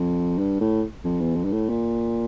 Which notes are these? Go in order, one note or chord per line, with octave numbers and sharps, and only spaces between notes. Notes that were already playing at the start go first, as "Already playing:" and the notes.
Already playing: F2
G2
A2
F2
E2
F2
G2
A2
A#2